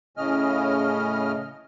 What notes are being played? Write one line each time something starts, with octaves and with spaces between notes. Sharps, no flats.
A2 C#3 C#4 D#5 F6